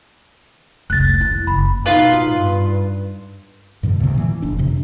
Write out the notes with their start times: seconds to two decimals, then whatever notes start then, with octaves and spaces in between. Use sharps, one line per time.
0.90 F1 C2 F#6 A6
1.21 E4
1.47 F#1 B5
1.86 B2 D#4 F4 B4
2.31 G2
3.83 G2 B2 D3
4.00 D2 C3
4.14 A#2 E3
4.42 F1 D4
4.58 F2 C3